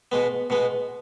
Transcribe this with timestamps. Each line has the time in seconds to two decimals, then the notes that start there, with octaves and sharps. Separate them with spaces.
0.12 B2 G#3 B3
0.50 B2 G#3 B3